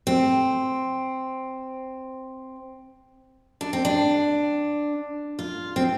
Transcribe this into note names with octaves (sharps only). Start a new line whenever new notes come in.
C4
D4
C4
D4
F4
C4